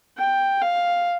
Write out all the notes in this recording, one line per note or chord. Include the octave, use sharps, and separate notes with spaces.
G5
F5